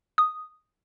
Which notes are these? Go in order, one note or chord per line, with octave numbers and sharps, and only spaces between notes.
D#6